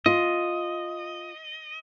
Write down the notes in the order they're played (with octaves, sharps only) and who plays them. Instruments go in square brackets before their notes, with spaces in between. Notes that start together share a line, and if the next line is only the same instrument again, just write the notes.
[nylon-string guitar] F4 [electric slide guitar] D#5